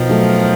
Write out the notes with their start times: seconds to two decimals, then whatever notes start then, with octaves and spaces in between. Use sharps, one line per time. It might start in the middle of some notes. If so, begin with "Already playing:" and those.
Already playing: B2 D#3 F3
0.09 F#3 A3